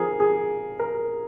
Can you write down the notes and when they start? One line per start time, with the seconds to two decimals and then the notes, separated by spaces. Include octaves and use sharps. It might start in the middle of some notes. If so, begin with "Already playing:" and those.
Already playing: F3 C4 G#4 A#4
0.20 G#4
0.79 A#4